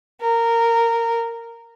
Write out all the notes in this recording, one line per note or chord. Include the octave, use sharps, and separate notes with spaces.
A#4